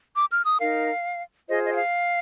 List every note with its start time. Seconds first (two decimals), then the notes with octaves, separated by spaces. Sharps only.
0.15 D6
0.31 F6
0.45 D#6
0.60 D#4 A#4 F5
1.48 F4 G#4 C5 D#5
1.64 D#5
1.72 G5
1.77 F5